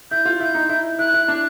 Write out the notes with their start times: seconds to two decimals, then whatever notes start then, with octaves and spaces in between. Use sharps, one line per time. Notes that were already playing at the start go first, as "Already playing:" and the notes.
0.11 E4 G6
0.25 F4
0.40 E4 G6
0.55 D#4
0.69 E4
0.99 E4 F#6
1.14 E4
1.28 D4